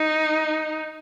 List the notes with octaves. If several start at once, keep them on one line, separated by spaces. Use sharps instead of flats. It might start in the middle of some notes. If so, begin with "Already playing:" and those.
Already playing: D#4